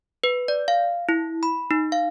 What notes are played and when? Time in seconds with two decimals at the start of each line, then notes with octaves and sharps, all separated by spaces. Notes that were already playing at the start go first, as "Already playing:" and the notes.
0.24 B4
0.48 D5
0.68 F5
1.09 E4
1.43 B5
1.71 D#4
1.92 F5